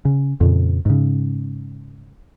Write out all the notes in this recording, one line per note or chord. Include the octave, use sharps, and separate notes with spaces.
C#3
F2 A#2 C#3
G#2 C#3